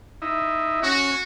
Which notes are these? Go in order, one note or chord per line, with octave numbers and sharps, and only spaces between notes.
D#4 E4
C#4 F#4